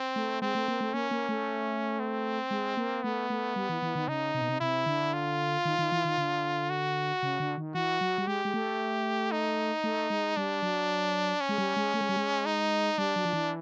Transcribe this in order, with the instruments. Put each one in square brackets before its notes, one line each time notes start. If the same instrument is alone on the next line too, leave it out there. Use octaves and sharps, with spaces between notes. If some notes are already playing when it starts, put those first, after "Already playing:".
Already playing: [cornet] C4
[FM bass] A3
[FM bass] G#3 [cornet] C4
[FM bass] A3
A#3
A3
[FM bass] A#3 [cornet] C#4
[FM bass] A#3
A3
[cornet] C4
[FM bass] G#3
A#3
[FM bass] A3 [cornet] B3
[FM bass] A3
G3
E3
E3
D#3
[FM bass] C#3 [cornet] D#4
[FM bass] C3
B2
C3
[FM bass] C3 [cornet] E4
[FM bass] D3
[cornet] F4
[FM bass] D#3
D#3
E3
D#3
D3
[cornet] F#4
[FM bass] C#3
D3
D#3
[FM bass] E3 [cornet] F#4
[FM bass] F#3
G3
[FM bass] G#3 [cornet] G4
[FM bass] G#3
A3
[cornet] D#4
[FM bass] A3
G#3
[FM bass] G3 [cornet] D4
[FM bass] F#3
[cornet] C#4
[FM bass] G#3
G3
G#3
A3
G#3
G3
G#3
[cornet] D#4
[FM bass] G3 [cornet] D4
[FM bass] F#3
F3
E3